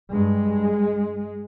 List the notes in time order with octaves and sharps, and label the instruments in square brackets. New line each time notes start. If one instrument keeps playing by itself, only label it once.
[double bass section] G2 G#3